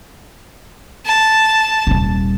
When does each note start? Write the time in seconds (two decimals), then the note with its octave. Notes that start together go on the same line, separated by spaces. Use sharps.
1.06 A5
1.87 D#1 G3